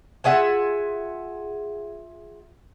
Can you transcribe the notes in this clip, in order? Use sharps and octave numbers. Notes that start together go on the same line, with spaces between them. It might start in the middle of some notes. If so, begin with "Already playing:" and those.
F4 G#4 E5 F#5